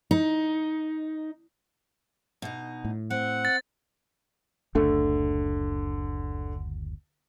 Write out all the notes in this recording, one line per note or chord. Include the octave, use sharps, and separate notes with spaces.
D#4
B2 D#4
A2
C4 F#5
A6
F#1 D2 D3 A3